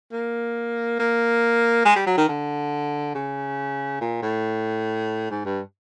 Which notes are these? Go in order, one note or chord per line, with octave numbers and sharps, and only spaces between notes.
A#3
A#3
G#3
G3
F#3
D#3
D3
C#3
A#2
A2
G#2
G2